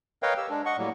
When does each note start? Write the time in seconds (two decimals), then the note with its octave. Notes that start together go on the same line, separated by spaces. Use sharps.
0.23 A#4 B4 C#5 D#5 F5 G5
0.37 G4 E6
0.50 G#3 D4
0.66 D#5 F#5 C#6
0.78 A2 F#3 G3 A#3